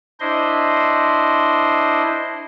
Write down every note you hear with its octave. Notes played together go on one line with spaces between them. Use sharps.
D4 E4 C5 D#5 C6